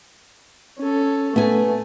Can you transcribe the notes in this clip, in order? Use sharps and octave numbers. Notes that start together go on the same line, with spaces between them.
C#4 A4
A3 B3 G#5